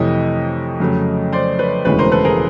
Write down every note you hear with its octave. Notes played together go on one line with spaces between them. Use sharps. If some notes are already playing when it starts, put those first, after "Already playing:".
Already playing: F2 C3 E3 A3 C#5 D#5
F2 C#3 F#3 A3
C5 D5
B4 C#5
E1 D2 C#3 E3 G#3 B4 C#5
A#4 C5
A4 B4
G#4 A#4